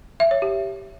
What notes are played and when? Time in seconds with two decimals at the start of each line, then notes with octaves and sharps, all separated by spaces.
0.20 E5
0.31 C#5
0.42 G4